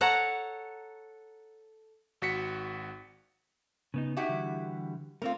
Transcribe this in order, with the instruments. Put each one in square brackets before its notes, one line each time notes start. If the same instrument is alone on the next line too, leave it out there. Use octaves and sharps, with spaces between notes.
[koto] A4 C#5 F#5 A5 A#5
[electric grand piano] G#1 F#4 B6 C#7
[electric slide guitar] C#3 B3 D#4
[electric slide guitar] D#4 [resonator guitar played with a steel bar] E4 F#4 G4
[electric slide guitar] D3 E3 G3
[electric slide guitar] A3 C4 [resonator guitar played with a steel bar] F4 A#4